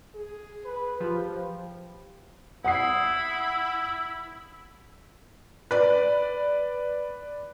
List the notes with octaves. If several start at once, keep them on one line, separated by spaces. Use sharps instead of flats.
G#4
B4
F3 G4
E4 F#5 D#6 C7
B4 D5